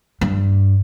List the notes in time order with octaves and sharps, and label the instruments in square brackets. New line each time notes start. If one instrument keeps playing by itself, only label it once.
[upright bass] G2